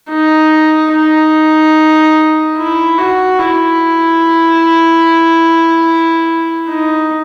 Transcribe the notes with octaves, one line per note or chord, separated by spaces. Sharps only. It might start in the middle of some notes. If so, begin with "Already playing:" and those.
D#4
D#4
E4
F#4
E4
D#4